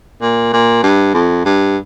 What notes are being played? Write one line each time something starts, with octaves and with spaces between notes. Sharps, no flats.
A#2
A#2
G2
F2
G2